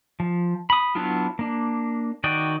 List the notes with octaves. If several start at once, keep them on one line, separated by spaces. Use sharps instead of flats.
F3
B5 D#6
F#3 B3 D4 E4 F4
A#3 D4
D#3 F#4 D5 D#5 G5